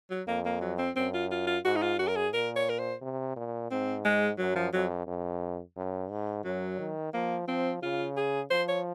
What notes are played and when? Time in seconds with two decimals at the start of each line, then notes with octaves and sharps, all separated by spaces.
0.10 F#3
0.27 F2 A#3
0.45 A#3
0.61 F#3
0.79 C4
0.96 F#2 C4
1.14 F4
1.31 F4
1.47 F4
1.65 G#2 F#4
1.76 D#4
1.82 F4
1.99 F#2 F#4
2.08 A#4
2.16 G#4
2.33 A#2 A#4
2.56 C#5
2.70 A#4
2.79 C5
3.02 C3
3.36 A#2
3.71 G#2 C4
4.05 G#3
4.39 F#2 F#3
4.56 F3
4.73 F2 F#3
5.07 F2
5.77 F#2
6.11 G#2
6.45 F#2 F#3
6.79 D#3
7.14 F3 A#3
7.48 F3 C4
7.82 C#3 F4
8.17 G#4
8.51 F3 C5
8.68 C#5